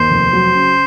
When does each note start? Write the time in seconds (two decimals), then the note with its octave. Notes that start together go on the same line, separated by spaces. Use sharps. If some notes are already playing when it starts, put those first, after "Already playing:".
Already playing: D#2 C5
0.10 F1
0.33 F#3
0.55 C#3